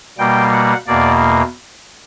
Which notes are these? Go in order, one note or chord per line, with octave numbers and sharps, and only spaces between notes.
B2 G3 A#3 G5
F#5
E2 B2 A#3 D5